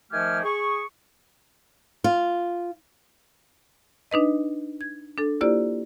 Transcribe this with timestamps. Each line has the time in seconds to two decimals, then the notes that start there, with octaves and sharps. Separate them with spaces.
0.12 D#3 F3 A3 G4 G#5 F6
0.43 G#4 C#6
2.04 F4
4.11 D4 D#4 B4 D#5
4.81 G#6
5.18 D4 A4
5.41 A#3 E4 F4 G4 C5 D5